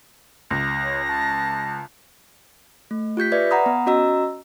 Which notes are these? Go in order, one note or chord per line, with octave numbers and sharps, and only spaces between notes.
C#2 A#6
C#5
A5
A3
F4 G4 G6 B6
B4 D5 E5
F#5 A#5 B5 D#6
B3
C#4 F#4 D#5 A#5 E6